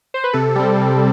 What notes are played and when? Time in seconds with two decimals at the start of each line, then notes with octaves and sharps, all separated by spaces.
0.14 C5
0.24 B4
0.33 C3 A4
0.55 G3 C4
0.78 C3